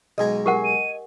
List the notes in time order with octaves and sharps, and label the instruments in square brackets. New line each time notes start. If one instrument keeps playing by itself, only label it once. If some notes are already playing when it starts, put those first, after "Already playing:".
[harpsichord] B1 G#3 A#5 [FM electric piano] D#5 G#5
[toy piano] G4 A#4 F#5
[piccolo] D#7